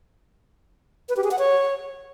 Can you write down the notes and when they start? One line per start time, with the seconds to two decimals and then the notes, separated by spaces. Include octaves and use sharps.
1.09 B4
1.17 G4
1.24 G#4
1.31 F#5
1.39 C#5